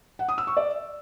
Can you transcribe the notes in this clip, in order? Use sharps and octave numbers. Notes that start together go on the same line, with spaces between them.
F#5
D#6
E6
C#6
D5